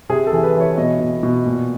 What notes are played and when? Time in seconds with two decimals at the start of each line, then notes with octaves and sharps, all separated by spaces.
0.09 C3 G#4
0.27 A4
0.32 E3
0.44 B4
0.55 E3
0.60 C#5
0.77 B2 D#5
1.00 B2
1.23 B2
1.46 A#2